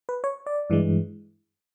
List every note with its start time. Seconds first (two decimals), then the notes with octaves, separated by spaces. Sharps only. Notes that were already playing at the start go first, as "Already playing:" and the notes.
0.09 B4
0.24 C#5
0.46 D5
0.70 G2 E3 G#3